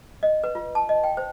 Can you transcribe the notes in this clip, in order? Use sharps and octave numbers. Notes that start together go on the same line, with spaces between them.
D#5
B4
F4
A5
D#5
G5
C5